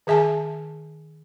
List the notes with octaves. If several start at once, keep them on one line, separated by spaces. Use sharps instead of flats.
D#3 G#4 E5 G#5 A5